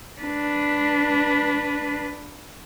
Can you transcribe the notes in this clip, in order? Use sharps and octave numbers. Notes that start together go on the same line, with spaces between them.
D4 B4